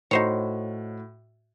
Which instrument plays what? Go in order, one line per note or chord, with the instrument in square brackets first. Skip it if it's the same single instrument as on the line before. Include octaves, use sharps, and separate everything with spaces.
[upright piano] A2 F#4 [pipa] D#4 C5 C#5